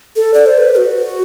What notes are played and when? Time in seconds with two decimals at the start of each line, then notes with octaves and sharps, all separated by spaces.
0.16 A4
0.34 D5
0.46 C5
0.57 B4
0.77 F#4